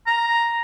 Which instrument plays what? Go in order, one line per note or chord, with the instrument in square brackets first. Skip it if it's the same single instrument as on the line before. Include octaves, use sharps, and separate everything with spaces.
[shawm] A#5